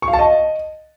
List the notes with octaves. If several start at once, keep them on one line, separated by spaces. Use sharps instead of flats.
C#6
F5
A5
D#5